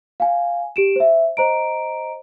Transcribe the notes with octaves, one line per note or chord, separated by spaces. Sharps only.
F5 G#5
G4 D7 E7
C5 E5
C5 D#5 A#5 D7